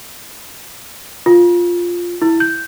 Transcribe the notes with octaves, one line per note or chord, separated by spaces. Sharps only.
F4
E4
G6